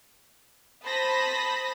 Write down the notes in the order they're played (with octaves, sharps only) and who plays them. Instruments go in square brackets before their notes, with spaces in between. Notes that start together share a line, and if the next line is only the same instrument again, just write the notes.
[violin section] C5 A5 B5 D#6 A#6 B6